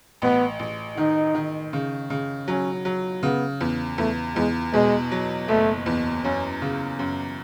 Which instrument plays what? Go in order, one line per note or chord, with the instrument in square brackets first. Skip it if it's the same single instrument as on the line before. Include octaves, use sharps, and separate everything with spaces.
[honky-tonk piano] A1 [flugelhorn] B3
[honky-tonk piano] A1
[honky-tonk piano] D#3 [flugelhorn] D#4
[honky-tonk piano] D#3
C#3
C#3
[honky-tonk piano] F#3 [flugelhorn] C#4
[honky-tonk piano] F#3
[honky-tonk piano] C#3 [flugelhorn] B3
[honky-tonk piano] E2
[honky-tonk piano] E2 [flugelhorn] A3
[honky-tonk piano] E2 [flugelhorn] G#3
[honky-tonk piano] B2 [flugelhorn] G#3
[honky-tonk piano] F#3
[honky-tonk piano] F#1 [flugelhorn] A3
[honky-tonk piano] E2
[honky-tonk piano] F#2 [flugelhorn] C#4
[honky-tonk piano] C#3
F#2